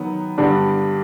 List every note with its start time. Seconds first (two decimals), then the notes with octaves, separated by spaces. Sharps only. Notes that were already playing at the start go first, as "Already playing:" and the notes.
Already playing: D#3 F#3 B3
0.38 G2 D3 G3 B3 D4